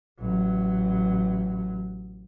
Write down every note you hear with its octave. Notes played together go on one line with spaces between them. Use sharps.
A1 F#3